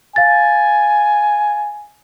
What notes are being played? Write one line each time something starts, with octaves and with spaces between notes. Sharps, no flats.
F5 G#5 A6